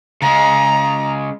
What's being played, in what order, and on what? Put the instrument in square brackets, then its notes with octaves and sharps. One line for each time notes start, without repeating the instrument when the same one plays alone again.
[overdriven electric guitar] C#3 G#3 [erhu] A#5